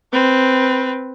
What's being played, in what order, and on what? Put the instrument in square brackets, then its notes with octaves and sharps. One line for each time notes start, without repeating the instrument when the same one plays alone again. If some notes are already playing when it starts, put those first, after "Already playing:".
[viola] C4 B4